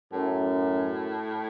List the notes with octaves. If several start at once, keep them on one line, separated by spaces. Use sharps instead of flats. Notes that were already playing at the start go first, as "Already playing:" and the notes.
F#2 A2